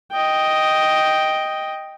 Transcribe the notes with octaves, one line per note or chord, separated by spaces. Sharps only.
D#5 G5